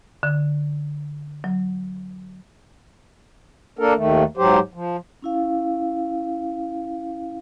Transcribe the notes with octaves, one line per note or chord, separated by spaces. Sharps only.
D3
F#3
A#3 D4 A4 A#4
D#2 D#3 A3
G#2 F#3 G4 C5
F3
C#4 E4 F5